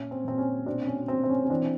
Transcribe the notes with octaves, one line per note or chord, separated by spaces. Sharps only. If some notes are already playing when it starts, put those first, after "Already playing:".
Already playing: A#2 C#4
C4
A#2 C4
C#4
B2 C4 D4
C#4
B2 C4
C4
C#4
C#4
E3 C4 D4